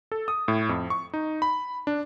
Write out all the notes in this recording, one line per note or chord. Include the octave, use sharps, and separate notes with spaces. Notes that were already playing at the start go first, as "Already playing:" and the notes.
A4
D#6
A2
F2
C#6
D#4
B5
D4